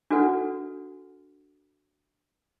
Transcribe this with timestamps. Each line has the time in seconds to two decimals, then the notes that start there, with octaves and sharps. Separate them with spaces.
0.10 D4 F#4 A4 B4 F#5